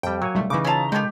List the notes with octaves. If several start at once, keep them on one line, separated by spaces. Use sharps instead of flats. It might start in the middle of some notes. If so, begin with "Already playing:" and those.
F2 G3 G5
F#3 A#3 C#5 G#5
B1 G3 A3
C#3 E3 D#4 D6
C#4 E4 F4 A5 A#5
D#3 G#3 G4 A4 G5 G6